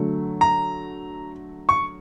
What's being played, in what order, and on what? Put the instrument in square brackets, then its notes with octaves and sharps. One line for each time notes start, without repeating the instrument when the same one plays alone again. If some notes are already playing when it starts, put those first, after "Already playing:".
Already playing: [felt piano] D3 F#3 A3
[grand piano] A#5
C#6